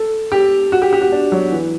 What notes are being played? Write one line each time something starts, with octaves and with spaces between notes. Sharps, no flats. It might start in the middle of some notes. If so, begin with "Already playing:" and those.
Already playing: A4
G4
F#4
G4
G4
F#4
D4
F#3
E3